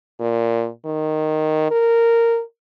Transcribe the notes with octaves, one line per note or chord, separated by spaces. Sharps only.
A#2
D#3
A#4